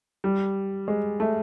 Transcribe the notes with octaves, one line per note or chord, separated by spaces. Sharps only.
G3
G#3
A3